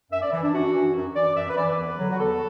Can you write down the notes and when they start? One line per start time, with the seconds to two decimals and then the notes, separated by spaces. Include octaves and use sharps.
0.11 F#2 E5
0.22 D5
0.31 E3
0.43 D4
0.53 F#2 F#4
0.73 E3
0.94 F#2
1.15 E3 D5
1.36 F#2 E5
1.50 B4
1.56 E3 D5
1.67 B4
1.77 E2
1.98 D3 F#3
2.10 F#4
2.19 E2 A4